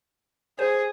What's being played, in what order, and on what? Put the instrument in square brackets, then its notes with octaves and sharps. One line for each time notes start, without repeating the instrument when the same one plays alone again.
[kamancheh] G#4 [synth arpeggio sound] C5